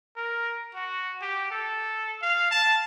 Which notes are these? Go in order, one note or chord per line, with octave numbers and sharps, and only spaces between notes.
A#4
F#4
G4
A4
F5
A5